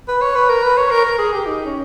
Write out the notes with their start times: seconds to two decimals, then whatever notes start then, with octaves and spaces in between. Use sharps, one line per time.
0.08 B4
0.21 C#5
0.35 B4
0.49 A#4
0.63 B4
0.77 C#5
0.91 A#4
1.05 A#4
1.18 G#4
1.33 G4
1.47 D#4
1.65 C#4